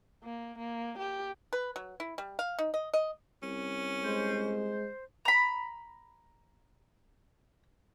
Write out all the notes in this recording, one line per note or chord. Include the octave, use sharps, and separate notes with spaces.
A#3
A#3
G4
B4
F#3
E4
G3
F5
D#4
D#5
D#5
C2 C#4
G#3 C5
A#5 B5